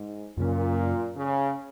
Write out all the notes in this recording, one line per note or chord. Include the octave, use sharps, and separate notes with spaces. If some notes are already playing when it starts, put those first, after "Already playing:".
Already playing: G#2
F#2 A#2 C#3 F#3 C#4
C#3